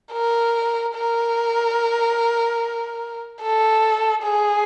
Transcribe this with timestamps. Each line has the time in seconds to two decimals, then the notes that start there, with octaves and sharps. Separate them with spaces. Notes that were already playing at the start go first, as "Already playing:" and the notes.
0.12 A#4
0.95 A#4
3.41 A4
4.23 G#4